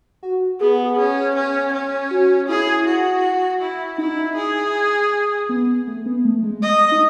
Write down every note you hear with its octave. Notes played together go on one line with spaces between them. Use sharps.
F#4
B3 G#4
C#4
C#4
C#4
F#4
E4 G#4
F#4
E4
D#4 E4
G#4
B3
A3
B3
A3
G#3
D#5
D#4